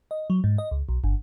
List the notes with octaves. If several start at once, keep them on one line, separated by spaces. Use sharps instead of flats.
D#5
F#3
G#2
D#5
C#2
B1
G1